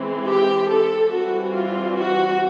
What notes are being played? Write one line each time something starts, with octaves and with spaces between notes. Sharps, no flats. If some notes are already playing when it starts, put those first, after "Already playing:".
Already playing: E3 G#3 C4
G4
A4
E3 G3 C4 F#4
F4
F#4